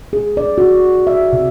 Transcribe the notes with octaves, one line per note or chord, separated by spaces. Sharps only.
G#4
D5
F#4
E5
C3